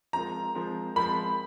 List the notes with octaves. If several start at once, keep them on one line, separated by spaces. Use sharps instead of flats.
F3 G#3 C4 F4 A#4 A#5
F3 G#3 C4 F4 A#4
F3 G#3 C4 F4 A#4 B5